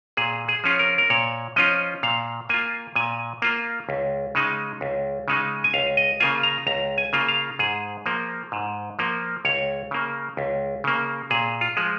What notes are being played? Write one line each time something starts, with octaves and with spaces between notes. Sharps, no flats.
A#2 G#4
G#4
F3 C#4 F4
A#4
A#4
A#2 C#5
F3 C#4 F4 D#5
A#2 F5
A#3 F4 G#5
A#2 G#5
A#3 F4
C#2
C#3 G#3 D#4
C#2
C#3 G#3 D#4
G#5
C#2 F5
D#5
C#3 A#3 F4 G#5
A#5
C#2 A#5
G#5
C#3 A#3 F4
F5
G#2 G#4
F3 A#3
G#2
F3 A#3
C#2 C#5
C#3 A#3
C#2
C#3 A#3
A#2 G#4
F4
F3 G#3